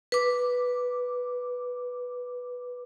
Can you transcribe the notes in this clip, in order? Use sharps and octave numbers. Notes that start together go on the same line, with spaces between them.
B4 D6